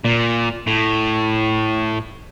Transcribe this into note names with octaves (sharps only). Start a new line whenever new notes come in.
A#2
A2